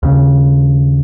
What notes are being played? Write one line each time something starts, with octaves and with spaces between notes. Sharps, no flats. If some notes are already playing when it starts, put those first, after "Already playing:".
D#2 C#3